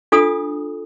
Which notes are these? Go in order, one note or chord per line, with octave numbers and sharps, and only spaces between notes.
D4 F4 A4 D#6